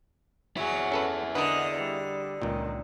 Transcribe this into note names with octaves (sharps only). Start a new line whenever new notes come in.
F#3 E4 G#4
C#4 A4 B4
D3 A#4 B4 D#5
G3
C#2 A#2 D#3